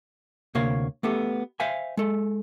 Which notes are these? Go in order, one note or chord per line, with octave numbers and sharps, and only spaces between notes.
D2 C3 A#3 C#5 F5
A3 B3 G4 A4
C5 E5 F5 G#5
G#3 A4